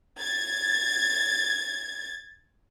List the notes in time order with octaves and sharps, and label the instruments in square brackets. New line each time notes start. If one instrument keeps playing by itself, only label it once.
[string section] G#6 A6